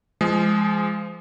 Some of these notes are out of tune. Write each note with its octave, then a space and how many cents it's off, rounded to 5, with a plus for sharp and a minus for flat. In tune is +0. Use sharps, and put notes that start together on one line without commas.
F3 -30 G#3 +0 G#4 +0